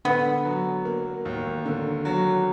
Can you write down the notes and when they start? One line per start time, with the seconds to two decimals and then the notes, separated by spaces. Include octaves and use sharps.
0.05 D3 B3
0.45 F#3
0.85 A#3
1.25 D#2
1.66 D3
2.05 F#3